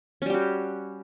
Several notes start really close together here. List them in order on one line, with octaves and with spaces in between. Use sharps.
C#4 G3 G4 F#4